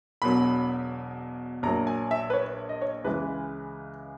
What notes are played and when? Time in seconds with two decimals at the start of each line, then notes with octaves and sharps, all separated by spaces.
0.22 E1 E2 B2 F#3 B5
1.63 A#1 A#2 F#3 A#5
1.87 G#5
2.11 E5
2.30 B4
2.33 C#5
2.69 D#5
2.82 C#5
3.04 C#2 C#3 E3 G#3 B4